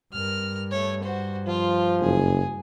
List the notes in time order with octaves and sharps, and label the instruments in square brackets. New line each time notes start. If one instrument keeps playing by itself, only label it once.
[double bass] G2 [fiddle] A#4 F6
[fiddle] A3 C#5
F#4 C5
[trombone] F3 [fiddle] F4
[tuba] F#1 [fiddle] G#4